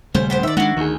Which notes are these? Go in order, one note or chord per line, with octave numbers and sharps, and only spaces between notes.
D#1 C#3 G3 A3 C5
B3 G4 C5
D#3 D5 E5
G#3 B3 D4 E4 F#4
D2 D#3 G#4